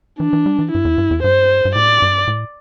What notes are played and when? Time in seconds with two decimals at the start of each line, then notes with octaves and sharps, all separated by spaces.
0.20 E3 D4
0.33 E3
0.46 G3
0.59 E3
0.71 G2 E4
0.85 E2
0.98 G2
1.11 E2
1.23 G2 C5
1.65 G2
1.75 A2 D5
2.02 G2
2.28 A2